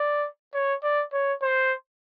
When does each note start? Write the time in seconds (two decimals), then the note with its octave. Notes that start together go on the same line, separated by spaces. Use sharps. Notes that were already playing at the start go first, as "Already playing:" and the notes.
Already playing: D5
0.54 C#5
0.83 D5
1.13 C#5
1.42 C5